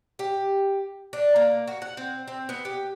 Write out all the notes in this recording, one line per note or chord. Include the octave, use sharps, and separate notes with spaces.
G4
D4
A#3
F#4
F#5
C4
C4
B3
G4